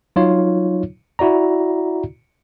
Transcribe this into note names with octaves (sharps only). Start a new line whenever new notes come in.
F#3 D#4 F4 C#5
E4 F#4 D5 A#5